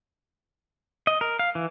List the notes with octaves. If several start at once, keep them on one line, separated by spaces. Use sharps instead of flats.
D#5
A#4
F5
E3